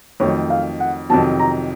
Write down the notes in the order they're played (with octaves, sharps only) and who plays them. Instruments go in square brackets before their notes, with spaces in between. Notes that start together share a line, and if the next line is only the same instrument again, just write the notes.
[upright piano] F2 D#3 F#3 A3 [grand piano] C#5
[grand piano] F5
F#5
[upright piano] F2 C3 D#3 F#3 [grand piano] A5
[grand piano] A#5